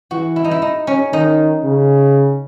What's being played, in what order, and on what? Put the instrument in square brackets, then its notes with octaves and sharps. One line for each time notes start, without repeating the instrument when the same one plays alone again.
[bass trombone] E3 [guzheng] F#4
[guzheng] E4
D#4
E4
D#4
C#4
[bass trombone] D#3 [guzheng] D#4
[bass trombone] C#3